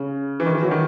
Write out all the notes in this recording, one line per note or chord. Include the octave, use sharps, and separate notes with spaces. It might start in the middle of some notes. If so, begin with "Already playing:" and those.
Already playing: C#3
E3
D#3
E3
F#3
D#3